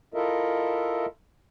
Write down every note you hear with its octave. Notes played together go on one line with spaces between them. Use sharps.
E4 F4 A4 A#4 D#5 E5